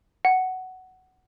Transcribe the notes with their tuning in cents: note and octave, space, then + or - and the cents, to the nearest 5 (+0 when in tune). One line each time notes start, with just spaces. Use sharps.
F#5 +10